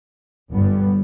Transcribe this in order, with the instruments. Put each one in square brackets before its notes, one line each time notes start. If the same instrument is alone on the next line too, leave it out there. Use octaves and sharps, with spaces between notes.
[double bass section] G1 G2 G3 B3